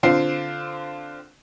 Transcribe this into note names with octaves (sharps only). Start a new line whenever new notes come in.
D3 C4 F4 C7